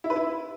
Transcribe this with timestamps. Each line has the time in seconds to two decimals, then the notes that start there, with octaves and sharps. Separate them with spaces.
0.04 E4
0.10 B4
0.16 E4